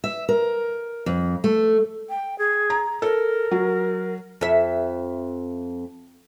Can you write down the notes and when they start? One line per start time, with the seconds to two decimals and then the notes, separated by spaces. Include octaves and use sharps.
0.04 E5
0.29 A#4
1.06 F2
1.44 A3
2.10 G5
2.39 G#4
2.70 A#5
3.02 A4 A#4
3.51 F#3
4.41 F2 E5